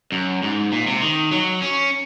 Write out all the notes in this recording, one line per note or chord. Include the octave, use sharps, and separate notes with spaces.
F#2
G#2
A#2
C3
D#3
F#3
C#4